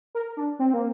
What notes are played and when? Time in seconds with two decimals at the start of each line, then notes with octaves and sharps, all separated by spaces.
0.15 A#4
0.37 D4
0.59 C4
0.74 A#3